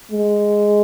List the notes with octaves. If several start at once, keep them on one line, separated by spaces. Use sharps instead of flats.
G#3